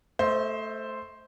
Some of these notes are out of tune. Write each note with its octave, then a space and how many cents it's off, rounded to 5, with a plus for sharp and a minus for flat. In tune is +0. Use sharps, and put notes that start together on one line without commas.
A3 +0 C5 +0 D#5 +40